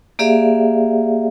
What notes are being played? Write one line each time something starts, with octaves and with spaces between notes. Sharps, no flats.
A#3 G4 G#4 D5 E5 F5